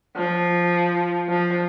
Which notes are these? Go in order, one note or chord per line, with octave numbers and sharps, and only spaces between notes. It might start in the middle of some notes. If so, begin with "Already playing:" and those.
F3
F3